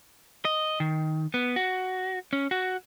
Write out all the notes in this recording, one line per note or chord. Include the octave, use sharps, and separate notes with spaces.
D#5
D#3
B3
F#4
C#4
F#4